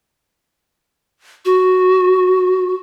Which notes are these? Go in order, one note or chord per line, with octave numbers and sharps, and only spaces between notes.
F#4